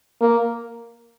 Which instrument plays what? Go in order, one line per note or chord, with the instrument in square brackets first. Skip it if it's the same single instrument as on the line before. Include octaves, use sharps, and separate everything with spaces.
[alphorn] A#3